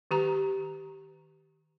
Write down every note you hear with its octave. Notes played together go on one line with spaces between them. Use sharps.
D#3 G4 A#5